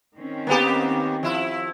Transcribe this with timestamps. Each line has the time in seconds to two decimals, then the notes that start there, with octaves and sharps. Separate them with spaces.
0.17 D#3 C4 C#4
0.47 A#3 B3 G4
1.23 F3 E4